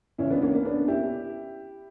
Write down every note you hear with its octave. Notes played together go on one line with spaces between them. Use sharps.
C#2 C#3 E3 C#4 E4
B3 D4
A#3 C#4
A#3 C#4
B3 D4
E4 G4